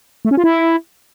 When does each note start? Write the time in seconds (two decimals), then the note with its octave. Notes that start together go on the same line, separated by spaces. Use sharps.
0.25 A3
0.31 C#4
0.37 F4
0.44 E4